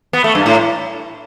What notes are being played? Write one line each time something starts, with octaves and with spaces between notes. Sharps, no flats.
B3
A3
G2
A2